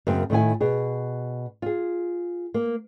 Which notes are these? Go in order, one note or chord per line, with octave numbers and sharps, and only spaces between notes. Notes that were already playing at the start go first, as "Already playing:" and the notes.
F#2 C#3 A#3 C4
A2 D#3 E4 G#5
B2 G#4
F4 G#4
A#3